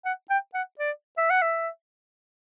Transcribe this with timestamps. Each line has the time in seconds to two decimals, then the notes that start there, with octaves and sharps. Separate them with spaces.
0.05 F#5
0.30 G5
0.54 F#5
0.79 D5
1.18 E5
1.30 F#5
1.42 E5